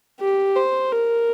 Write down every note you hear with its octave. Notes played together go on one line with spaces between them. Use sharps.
G4
C5
A#4